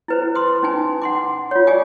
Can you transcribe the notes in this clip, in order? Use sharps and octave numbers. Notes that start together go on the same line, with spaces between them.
E4 B4 C5
C6 D#6
C#4 D#4 G#5
F#5 C6 D6
F4 C#5
G4 D5 G#5 D6 D#6